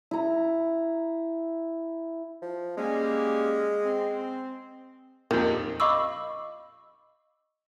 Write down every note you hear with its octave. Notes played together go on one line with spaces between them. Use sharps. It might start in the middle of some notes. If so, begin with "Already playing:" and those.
E4 A#5
F3
G3 G#3 A#3 C#4
C4
F2 A#2 D#3 D#4 G4 A#4
D#5 F5 B5 C#6 D6 E6